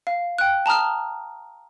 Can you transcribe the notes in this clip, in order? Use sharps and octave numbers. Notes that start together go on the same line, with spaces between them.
F5
G5 F#6
A5 A#5 D#6 F6